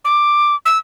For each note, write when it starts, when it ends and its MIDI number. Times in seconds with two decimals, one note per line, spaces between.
0.05 0.55 86
0.66 0.78 88